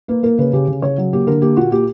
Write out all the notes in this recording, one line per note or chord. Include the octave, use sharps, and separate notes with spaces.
A#3 B4
A#3 A#4
C#3 B4
C#3 G4
C#3
C#3 C#5
F#3
A#3 G4
D3 A#4
A#3 G4
A#2 F#4
A#3 G4